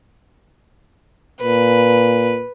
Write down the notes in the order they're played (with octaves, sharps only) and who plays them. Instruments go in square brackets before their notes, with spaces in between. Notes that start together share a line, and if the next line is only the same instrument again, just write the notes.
[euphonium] A#2 [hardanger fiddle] B4